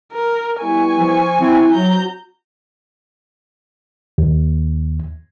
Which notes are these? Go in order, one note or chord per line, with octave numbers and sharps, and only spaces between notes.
A#4
G3 B3 E4 G#5 C#6
F3
C4 E4
F#3 C4 F#4 A#5 G6
D#2